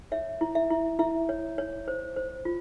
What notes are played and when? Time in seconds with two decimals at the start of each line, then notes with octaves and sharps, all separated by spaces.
0.12 C#5 E5
0.41 E4
0.55 E5
0.70 E4
0.99 E4 E5
1.29 C#5
1.58 C#5
1.88 C5
2.16 C5
2.45 F4